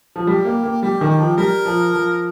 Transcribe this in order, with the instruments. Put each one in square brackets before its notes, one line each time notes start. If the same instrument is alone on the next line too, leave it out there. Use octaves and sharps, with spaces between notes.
[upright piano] F3
[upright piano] G3 [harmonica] G4
[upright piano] A#3
A#3
[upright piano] G3 [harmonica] G4
[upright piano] D#3
[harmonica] G4
[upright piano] F3
[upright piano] G3 [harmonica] A#4
[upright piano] F3
F3